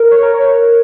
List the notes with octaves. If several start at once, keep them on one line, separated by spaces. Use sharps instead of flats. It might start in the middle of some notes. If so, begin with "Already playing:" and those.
Already playing: A#4
C#5
A#4
C#5